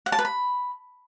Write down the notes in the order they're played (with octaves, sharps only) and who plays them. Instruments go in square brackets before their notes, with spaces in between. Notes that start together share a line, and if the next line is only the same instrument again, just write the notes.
[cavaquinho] F#5
A5
B4
B5